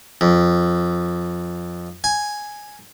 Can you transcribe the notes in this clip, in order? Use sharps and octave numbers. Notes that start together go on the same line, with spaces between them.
F2
G#5